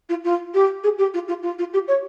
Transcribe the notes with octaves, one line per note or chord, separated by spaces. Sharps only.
F4
F4
G4
G#4
G4
F4
F4
F4
F4
G4
C#5